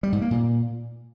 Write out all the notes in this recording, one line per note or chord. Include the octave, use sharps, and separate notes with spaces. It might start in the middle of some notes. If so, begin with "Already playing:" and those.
G3
G#2
A#3
A#2